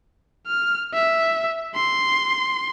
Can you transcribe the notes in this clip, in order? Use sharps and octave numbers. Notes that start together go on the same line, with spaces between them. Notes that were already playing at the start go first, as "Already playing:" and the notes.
F6
E5
C6